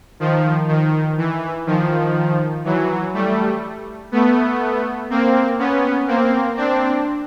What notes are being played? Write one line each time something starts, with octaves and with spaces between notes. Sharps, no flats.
D#3 F3
D#3
E3
D#3 F3
E3 F#3
G3 A3
A3 B3
A#3 C4
B3 C#4
A#3 C4
C4 D4